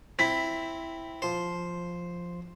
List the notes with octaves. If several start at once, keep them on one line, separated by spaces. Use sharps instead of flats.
C4 E4 B6
F3 C5 C6